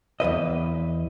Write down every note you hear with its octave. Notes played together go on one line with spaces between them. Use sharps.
E2 G2 B4 D#5